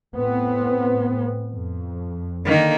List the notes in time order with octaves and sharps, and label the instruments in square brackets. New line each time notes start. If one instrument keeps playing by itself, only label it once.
[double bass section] A2 B3 C4
F2
[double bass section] D3 [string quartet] D#3 A#3